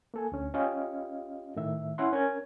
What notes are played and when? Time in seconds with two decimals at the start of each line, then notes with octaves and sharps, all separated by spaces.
0.14 A#3 A4 G#5
0.32 D2 C#4
0.54 C#4 F4 G4 D#5 F5
1.56 A2 D#3 E5
1.98 C#4 E4 F#5 C6
2.13 C#4 A#4 G#6